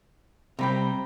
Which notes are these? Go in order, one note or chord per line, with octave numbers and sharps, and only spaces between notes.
C3 G3 C4 A#5 B5 G6